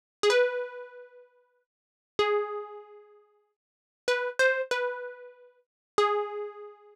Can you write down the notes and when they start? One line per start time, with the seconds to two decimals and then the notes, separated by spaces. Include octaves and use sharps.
0.23 G#4
0.30 B4
2.19 G#4
4.08 B4
4.39 C5
4.71 B4
5.98 G#4